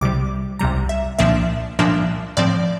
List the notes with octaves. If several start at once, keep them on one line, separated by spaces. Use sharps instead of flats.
C2 C3 G3 D6
C2 C3 G3 A#5
E5
C2 A#2 F3 A#3 D4 E5
C2 A#2 F3 A#3 D4 E5
A2 F3 C4 D5